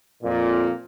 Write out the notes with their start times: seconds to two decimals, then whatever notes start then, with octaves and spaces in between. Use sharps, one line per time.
0.23 F2 A#2